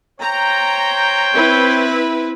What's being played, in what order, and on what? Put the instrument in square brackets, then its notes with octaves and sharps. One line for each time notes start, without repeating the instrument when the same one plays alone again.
[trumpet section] C5 C#5 G5 [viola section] A#5
[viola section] C4 E4 B4